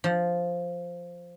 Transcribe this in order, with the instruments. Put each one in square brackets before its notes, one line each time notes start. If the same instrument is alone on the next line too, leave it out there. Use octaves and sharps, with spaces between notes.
[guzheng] F3